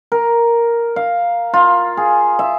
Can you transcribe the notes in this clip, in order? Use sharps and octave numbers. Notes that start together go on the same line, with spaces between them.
A#4
F5
F4
G#4
E5